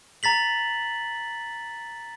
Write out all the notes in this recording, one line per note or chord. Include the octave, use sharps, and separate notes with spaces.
A#5 A6 B6 F#7